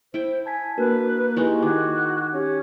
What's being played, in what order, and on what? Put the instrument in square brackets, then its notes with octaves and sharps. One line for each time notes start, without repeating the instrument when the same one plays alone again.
[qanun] E4 G5 [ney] C5
[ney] G#5 [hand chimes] A5 G#6 B6
[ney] A#3 [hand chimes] D4 F#4 A#4 [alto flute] B4
[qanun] G#3 D#4 F#4 [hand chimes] E4 G4
[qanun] D#3 [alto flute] F#4 [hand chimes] D6 G#6
[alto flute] C#4 [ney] G4